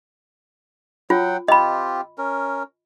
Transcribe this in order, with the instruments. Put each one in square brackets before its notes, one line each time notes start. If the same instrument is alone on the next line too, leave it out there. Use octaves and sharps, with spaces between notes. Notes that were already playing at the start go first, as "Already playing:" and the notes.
[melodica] F#3 F#5 G5 [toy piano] F4
[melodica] C4 F4 G4 [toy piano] D#5 B5
[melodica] C#4 A#4